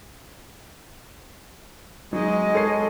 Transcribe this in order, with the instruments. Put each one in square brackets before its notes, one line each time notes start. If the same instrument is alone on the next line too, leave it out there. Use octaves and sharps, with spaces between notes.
[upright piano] F#3 D#4 [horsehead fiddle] G#3 D#5
[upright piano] A4 C#5 C7